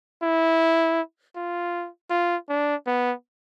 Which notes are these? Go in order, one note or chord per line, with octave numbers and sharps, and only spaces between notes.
E4
F4
F4
D4
B3